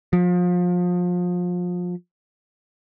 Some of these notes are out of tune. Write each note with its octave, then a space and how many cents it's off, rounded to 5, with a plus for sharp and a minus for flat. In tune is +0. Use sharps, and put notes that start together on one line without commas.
F3 +30